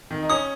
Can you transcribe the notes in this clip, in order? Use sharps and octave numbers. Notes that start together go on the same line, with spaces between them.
D#3
D#4
C#4 D#6